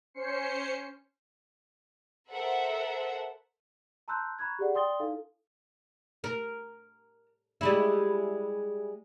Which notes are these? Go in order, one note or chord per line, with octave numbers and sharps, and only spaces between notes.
C#4 C5 C7 C#7
A4 A#4 C5 E5 F#5
A5 A#5 C6 E6 F#6 G6
A#5 B5 C#6 F#6 G#6
G4 G#4 D5 F#5
D5 G5 C6 D#6 A6 G7
D#4 E4 A4 F5
A#4
G3 G#3 E4